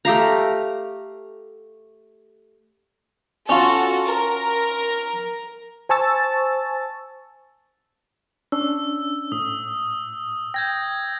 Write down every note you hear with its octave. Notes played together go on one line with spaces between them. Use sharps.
A3 G4 F5 A#5
C#4 F4 F#4 A4
A#4
C5 G#5 A5 C#6 E6 A6
C#4 D4 E6
A2 D#6
G5 G6 G#6 A#6